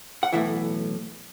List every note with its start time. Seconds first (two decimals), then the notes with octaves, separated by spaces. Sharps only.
0.23 F#5
0.33 B1 A2 E3 E5